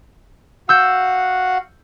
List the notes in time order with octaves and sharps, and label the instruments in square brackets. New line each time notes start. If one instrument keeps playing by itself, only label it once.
[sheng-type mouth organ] F#4 F5 F#5 [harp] E6 G6